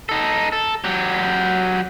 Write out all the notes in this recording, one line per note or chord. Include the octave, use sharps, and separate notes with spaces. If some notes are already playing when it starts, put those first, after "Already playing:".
D#4 A4
A4
F#3 G4